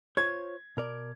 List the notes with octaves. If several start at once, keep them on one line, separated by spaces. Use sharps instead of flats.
F4 C5 C#5 G#6
B2 A#4 D5